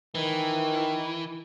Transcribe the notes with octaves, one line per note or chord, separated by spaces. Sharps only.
D#3 E3